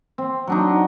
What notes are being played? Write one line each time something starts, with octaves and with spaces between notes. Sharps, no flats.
C4
F#3 D4 D#4